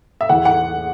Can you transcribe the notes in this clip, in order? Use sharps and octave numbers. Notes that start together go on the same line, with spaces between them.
E5
E2 F#5
F#5